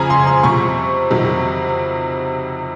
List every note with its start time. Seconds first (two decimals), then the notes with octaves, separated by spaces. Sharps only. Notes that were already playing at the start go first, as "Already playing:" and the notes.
Already playing: F2 C#3 F3 G#5 A#5
0.10 C6
0.27 C6
0.43 F2 C3 F3 C#6
1.10 F2 C3 D#3 F#3